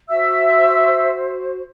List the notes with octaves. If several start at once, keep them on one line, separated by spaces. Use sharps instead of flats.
F#4 C5 E5 E6